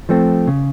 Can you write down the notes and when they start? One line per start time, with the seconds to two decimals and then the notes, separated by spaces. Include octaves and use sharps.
0.09 F3 A3 C4
0.47 C#3